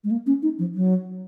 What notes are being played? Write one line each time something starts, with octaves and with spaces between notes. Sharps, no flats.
G#3
A#3
C#4
D#4
F3
F#3